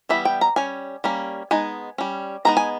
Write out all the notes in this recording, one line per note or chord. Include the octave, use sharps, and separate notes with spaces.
E3 G3 B3 E5
G5
A#5
G3 C#4 G#5
G3 A#3 C#4
G#3 B3 D#4 G#5
G3 C#4
G#3 B3 D#4 A#5
G#5